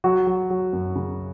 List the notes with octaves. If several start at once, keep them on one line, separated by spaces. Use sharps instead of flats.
F#3 F#4
F#3
F#3
F#2
C#3